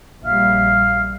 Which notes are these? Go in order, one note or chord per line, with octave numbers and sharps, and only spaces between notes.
A#1 G3 E5 F5 F6